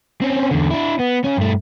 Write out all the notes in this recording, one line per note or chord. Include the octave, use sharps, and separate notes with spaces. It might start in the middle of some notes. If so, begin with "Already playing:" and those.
C4 C#4
E2 D3
D4 E4
B3
C#3 C#4
G2 A3